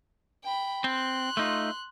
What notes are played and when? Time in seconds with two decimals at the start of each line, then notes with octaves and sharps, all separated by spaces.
0.45 G5 B5
0.84 C4 C6 F#6
1.37 A3 D#4 F4